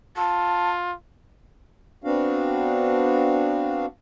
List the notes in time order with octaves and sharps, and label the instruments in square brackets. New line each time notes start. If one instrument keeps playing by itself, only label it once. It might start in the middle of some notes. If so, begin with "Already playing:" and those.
[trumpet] F4 [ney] A5
[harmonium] B3 C4 D4 F#4 F5